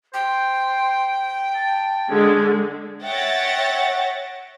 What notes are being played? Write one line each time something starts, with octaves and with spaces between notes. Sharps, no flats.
C5 G5
A5
D3 G#3 C#4
C#5 E5 F#5 G5 A6 A#6